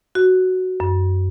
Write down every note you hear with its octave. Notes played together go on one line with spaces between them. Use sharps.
F#4
F#2